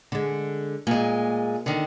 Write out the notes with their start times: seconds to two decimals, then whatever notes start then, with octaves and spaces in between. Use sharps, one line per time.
0.12 D3 G#3
0.87 A#2 G#3 A#3
1.66 D3 D#3